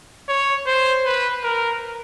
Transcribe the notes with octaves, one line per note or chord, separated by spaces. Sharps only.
C#5
C5
B4
A#4